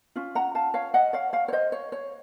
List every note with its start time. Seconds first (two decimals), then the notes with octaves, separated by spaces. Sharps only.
0.16 C#4 F4
0.35 F#5 A#5
0.55 F5 A5
0.74 C#5 F5
0.94 D#5 F#5
1.13 C#5 F5
1.33 C#5 F5
1.48 C#5
1.53 C5 D#5
1.72 C#5
1.92 C#5